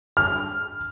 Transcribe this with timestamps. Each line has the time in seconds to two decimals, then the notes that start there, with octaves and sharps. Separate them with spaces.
0.17 F6